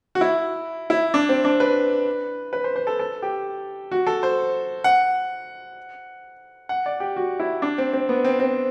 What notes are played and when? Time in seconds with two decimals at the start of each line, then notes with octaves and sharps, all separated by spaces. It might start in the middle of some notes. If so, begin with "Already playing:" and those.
0.15 F#4
0.21 E4
0.90 E4
1.14 D4
1.29 C4
1.45 D4
1.60 B4
2.53 B4
2.64 C5
2.76 C5
2.87 A4
2.99 A4
3.22 G4
3.91 F#4
4.07 A4
4.23 C5
4.84 F#5
6.69 F#5
6.86 D5
7.00 G4
7.16 F#4
7.40 E4
7.62 D4
7.78 C4
7.93 C4
8.09 B3
8.24 C4
8.40 C4